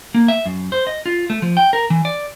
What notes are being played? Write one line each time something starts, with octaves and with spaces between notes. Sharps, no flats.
A#3
E5
F#2
C5
D#5
F4
A3
F3
G5
A#4
E3
D5